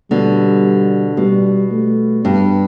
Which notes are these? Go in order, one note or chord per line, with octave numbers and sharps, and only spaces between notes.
B2 D3 G3
B2 G3
A3
G2 B3